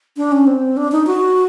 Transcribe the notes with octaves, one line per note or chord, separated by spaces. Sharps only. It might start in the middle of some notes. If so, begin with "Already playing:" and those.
D4
C#4
C4
D4
D#4
F#4